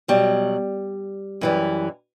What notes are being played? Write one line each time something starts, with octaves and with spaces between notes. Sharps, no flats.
B2 F#3 G3
F#2 E3 G3